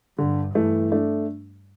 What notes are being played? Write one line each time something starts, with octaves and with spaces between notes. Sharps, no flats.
G2 D3
G2 E3 A3
A3 D4